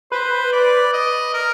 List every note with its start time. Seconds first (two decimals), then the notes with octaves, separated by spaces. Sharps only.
0.11 B4 C5
0.53 D5
0.93 D#5
1.34 A#4